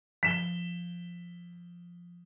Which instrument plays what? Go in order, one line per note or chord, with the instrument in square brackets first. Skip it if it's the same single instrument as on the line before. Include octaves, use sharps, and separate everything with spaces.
[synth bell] F3 G7 [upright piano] B6 E7